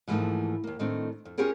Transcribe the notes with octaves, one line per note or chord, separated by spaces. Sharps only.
G#2 E3 F3 A3 A#3 D#4
D#2 A#3
A2 D#3 A3 C4 D4
F2
C#4 F4 G4 G#4 A#4 C#5